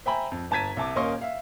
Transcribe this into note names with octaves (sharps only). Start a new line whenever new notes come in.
C5 E5 G5 G#5 A#5 B5
F2
G1 A5 A#5 G#6 B6 D#7
C2 E5 A5 D6
D#1 A#3 C#4 D#5 C6 C#6
E5 F5